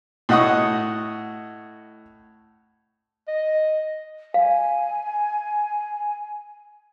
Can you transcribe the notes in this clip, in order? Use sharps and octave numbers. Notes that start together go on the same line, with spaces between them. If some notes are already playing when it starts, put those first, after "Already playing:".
A2 F#4 D#5 F#5 C#6 D#6
D#5
F5 G#5